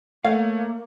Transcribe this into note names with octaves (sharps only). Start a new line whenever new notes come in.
A3 A#3 C#5 F5